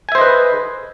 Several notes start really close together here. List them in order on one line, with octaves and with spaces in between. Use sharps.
G#5 E5 C5 D#5 B4